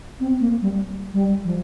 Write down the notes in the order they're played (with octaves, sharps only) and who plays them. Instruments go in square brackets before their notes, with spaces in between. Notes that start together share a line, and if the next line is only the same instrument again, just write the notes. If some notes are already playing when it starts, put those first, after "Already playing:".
[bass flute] C4
A#3
G3
G3
F3